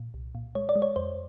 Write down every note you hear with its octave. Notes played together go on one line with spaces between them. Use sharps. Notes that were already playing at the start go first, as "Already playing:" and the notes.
Already playing: A#2
C2
A#2
G#3 C#5
D5
G#3
C#5
F2 C5